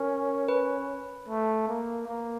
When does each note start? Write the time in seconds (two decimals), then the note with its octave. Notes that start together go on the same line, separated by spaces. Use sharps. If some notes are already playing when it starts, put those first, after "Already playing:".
Already playing: C#4 A#4
0.48 B4
1.28 A3
1.68 A#3
2.07 A#3